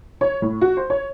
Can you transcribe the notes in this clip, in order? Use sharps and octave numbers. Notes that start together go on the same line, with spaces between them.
C#5
A2
F#4
C5
C#5